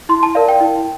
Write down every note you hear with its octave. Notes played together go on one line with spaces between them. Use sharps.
E4 C6
A5
A#4 D5 F5
G5
E4